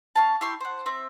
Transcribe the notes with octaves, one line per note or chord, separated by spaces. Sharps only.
C#4 F5 A5
E4 G4 C6 C#6
C5 F#5
C4 E5